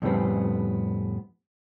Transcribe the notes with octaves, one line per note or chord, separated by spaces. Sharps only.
F2 A2 C#3 G3 B3 C4